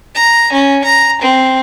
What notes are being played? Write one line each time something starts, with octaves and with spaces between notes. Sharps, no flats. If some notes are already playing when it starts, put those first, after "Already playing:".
A#5
C#4
A#5
C4